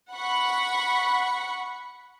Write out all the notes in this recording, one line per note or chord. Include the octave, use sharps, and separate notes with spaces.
F#5 B5 C#6